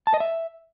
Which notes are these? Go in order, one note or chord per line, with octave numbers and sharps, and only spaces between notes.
A5
D#5
E5